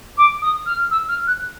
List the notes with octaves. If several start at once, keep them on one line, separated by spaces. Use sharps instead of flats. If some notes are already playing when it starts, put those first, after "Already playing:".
D6
D#6
F6
E6
F6
F#6